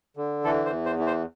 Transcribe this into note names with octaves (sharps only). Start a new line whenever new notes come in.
D3
E3 A4
C5
E2
C5
E3
C5